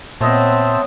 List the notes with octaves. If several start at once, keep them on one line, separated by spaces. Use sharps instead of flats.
A#2 B3 C4 C5 C#5 D#5 E5 A5